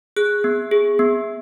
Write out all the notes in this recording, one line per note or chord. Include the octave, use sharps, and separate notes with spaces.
G#4 F#6
B3
G#4
B3